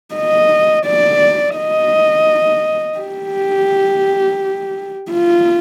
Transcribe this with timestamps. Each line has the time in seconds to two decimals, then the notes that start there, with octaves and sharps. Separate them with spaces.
0.15 D#5
0.86 D5
1.57 D#5
2.99 G4
5.12 F4